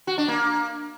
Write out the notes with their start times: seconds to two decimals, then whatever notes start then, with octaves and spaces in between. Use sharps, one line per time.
0.07 F#4
0.18 D4
0.28 A#3